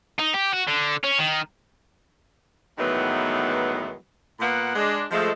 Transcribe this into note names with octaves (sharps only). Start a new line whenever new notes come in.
D#4
G4
F#4
D3
C#4
D#3
A2 D#3 E3 F#3 G#3 B3
A#2 A#3 B3 F#5
G#3 D4
F3 G#3 A3